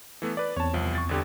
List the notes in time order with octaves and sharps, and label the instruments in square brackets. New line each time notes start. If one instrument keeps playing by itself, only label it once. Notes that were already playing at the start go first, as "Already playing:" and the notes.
[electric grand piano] E3 A3 B3
B4 D5
[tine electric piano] E2 C4 [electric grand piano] C#5 A5
[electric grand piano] C2 F3
C#6 A6
G1 D3 G4